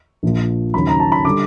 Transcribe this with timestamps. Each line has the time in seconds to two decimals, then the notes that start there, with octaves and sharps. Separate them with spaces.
0.23 A#1 A#2 F3
0.74 D#2 C#3 F#3 B5
0.87 A#5
1.00 A5
1.12 B5
1.25 D3 G3 D6